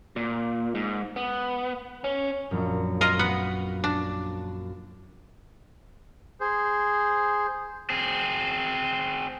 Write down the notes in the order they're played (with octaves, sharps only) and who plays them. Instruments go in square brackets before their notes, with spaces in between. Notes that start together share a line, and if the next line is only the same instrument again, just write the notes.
[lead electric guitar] A#2
G#2
B3
C#4
[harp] A#1 F#2
[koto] F4 A#4 D#5
B3 F#5
D4
[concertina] G#4 C5
[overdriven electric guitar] C4 G#4